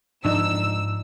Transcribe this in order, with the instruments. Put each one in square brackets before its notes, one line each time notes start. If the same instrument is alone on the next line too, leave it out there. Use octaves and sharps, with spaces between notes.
[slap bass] G#2 F3 [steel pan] D4 D#4 [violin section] E6